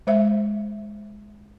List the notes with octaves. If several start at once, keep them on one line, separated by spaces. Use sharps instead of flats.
G#3 C5 E5